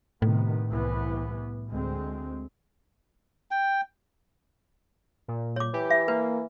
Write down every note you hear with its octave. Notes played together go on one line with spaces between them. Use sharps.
A2 C3 D#3 B3
C2 E3 B3
D2 G#3 C4
G5
A#2
C#5 D6
E3 G4
E5
A#3 B4